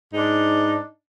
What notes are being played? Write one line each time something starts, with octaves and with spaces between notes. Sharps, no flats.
G#2 D4 D#4